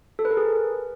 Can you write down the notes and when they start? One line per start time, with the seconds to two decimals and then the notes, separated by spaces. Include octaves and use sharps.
0.19 A4
0.25 B4
0.31 A#4
0.37 G#4